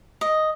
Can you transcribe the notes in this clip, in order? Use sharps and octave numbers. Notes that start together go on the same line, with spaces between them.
D#5